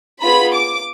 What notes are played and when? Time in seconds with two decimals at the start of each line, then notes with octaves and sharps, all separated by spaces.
0.22 B3 F4 G#4 B5
0.54 D6